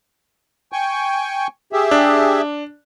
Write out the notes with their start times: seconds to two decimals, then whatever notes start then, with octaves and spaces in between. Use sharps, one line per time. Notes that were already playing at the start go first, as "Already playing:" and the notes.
0.72 G5 G#5 C#6
1.73 G4 G#4 E5
1.91 D4